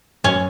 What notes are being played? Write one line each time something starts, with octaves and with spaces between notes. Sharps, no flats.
F#2 C#4